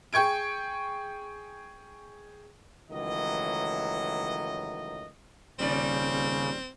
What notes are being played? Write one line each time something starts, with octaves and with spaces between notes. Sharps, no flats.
G#4 G5 C#6 G#6 D7
C#2 D#3 E3 F#3 A3 D#5
D#1 C#3 G3 C4 C#4 D5